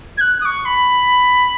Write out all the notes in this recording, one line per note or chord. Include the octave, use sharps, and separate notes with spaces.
G#6
F#6
D#6
C#6
B5